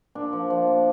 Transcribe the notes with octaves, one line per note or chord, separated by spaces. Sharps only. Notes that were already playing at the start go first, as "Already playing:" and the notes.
A#2 D4
F3
F3
A#2